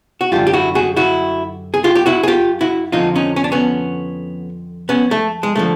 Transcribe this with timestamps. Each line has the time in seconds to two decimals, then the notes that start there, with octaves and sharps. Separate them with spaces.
0.21 F#4
0.32 F#2 D3 G3 F4 G4
0.47 G4
0.53 E4 F#4
0.75 F#4 G#4
0.96 E4 F#4
1.74 G#4
1.84 F4 G4
1.95 G4
2.06 E4 F#4
2.23 G#4
2.28 F4 G4
2.61 E4 F#4
2.92 F2 D3 F3 D#4 F4
3.15 C#4 D#4
3.36 C#4
3.44 D4
3.52 B3 C#4
4.89 B3 C#4
5.11 A3
5.43 G#3
5.56 D3 F3 A3